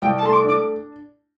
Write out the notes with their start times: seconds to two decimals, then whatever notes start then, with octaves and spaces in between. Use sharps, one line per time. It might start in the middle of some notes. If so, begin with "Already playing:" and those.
0.02 C2 G5
0.17 A5
0.22 A3 C6
0.33 D6
0.44 D4 D6